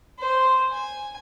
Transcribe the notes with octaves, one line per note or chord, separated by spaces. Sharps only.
C5
G#5